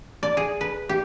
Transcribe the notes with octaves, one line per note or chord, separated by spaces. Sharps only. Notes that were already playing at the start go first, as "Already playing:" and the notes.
D5
G#4
B4
G4